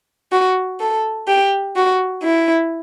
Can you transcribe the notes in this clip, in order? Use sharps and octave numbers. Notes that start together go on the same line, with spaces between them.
F#4
A4
G4
F#4
E4